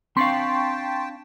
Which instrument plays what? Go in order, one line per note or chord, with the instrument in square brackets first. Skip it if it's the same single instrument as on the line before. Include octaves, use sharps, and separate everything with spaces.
[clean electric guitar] C4 D4 F5 [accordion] G5 A5 [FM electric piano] C6 C#6 B6